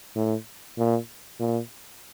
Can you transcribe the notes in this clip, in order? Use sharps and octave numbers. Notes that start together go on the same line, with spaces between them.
A2
A#2
A#2